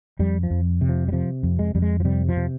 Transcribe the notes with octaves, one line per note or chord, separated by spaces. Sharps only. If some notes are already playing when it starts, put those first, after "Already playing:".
F2 G3
F3
F2
C3
F3
G3
C3 F3
F2
G#3
F2 G3
G#3
F3
C3 G3
F3
C3